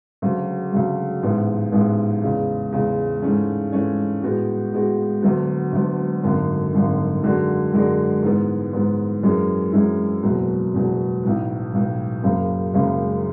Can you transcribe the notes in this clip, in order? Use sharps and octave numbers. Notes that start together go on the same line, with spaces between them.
D2 C#3 F#3
D2 C#3 F#3
A1 G#2 E3 B3
A1 G#2 E3 B3
E2 C#3 G#3
E2 C#3 G#3
G#2 E3 A3 C#4
G#2 E3 A3 C#4
A2 G#3 B3 F#4
A2 G#3 B3 F#4
D2 D3 F#3 B3
D2 D3 F#3 B3
G#1 F#2 D3 A3
G#1 F#2 D3 A3
F#2 D3 G#3 D4 F#4
F#2 D3 G#3 D4 F#4
G#2 E3 B3
G#2 E3 B3
F#2 E3 G#3 C#4 E4
F#2 E3 G#3 C#4 E4
F#1 E2 B2 F#3
F#1 E2 B2 F#3
B1 A2 E3
B1 A2 E3
F#1 F#2 C#3
F#1 F#2 C#3